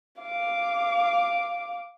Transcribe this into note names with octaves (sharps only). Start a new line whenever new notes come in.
F5 D6